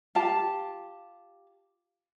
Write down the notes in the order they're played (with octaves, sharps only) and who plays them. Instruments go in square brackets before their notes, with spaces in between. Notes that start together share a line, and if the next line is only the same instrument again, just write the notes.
[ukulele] F4 G4 A5